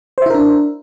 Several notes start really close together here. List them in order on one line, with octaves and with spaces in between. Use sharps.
C5 E5 E4 A#4 D4